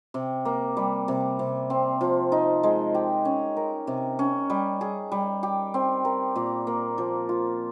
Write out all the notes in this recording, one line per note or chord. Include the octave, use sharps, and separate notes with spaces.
C3
A#3
G3
C3
C3
C4
F3
D#4
G#3
G4
C#4
A#4
C3
C#4
G3
G#4
G3
G4
C4
A#4
A#2
A#3
F3
F4